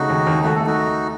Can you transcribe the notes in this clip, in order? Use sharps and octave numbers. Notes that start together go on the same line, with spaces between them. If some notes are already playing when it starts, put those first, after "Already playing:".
Already playing: C#3 A3 D#4 F#4
D#2
D#2
A3 F#4
A3 A4
D#4 F#4